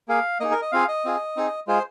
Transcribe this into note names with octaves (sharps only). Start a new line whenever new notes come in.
A#3 G#4 F5
A#3 D#4 G#4 D#5
A#4
D#5
C4 F4 G#4 F5
D#5
C4 F4 G#4
C4 D#4 G#4
G#3 F4 G#4 C5